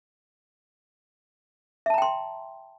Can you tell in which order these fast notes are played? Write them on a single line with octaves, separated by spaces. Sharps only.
E5 A5 A#5 G5 C6